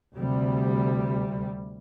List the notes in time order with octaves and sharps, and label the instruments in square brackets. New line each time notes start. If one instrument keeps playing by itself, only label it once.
[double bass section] D2 C3 G3